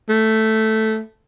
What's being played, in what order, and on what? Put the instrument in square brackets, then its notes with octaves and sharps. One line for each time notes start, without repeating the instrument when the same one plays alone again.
[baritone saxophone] A3